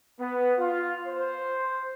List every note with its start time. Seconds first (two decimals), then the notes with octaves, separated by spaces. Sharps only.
0.20 B3
0.59 F4
1.06 C5